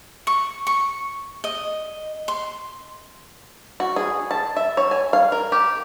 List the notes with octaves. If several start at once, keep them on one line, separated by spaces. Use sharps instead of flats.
C#6
C#6
D#5
C6
F#4
G#4
A5
E5
C#5
G#5
F5
A#4
G4